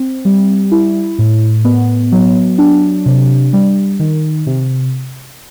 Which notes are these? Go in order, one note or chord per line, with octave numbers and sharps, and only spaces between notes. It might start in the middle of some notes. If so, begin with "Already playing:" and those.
Already playing: C4
G3
E4
A2
B3
F#3
D4
C3
G3
D#3
C3